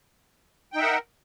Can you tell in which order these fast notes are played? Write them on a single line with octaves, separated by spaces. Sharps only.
G5 D#4 E5 F#5 A#4